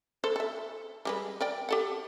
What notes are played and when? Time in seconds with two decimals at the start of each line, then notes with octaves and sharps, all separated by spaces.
0.24 A4 C5
0.36 A4 E5
1.05 G3 G#3 B4
1.41 A#4 D5 G5
1.69 G4 A4 F#5